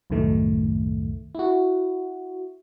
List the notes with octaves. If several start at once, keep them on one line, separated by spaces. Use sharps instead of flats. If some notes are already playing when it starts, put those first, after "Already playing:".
C2 F#2 A2 D#3 A3
E4 F#4